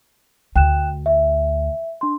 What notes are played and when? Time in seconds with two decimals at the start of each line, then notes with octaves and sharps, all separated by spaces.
0.56 D2 G5 F#6 E7
1.06 E5
2.01 D4 C6